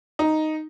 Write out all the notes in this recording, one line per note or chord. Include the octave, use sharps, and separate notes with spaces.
D#4